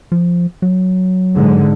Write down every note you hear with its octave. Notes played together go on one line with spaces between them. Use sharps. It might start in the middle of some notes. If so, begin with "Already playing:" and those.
F3
F#3
G#2 D3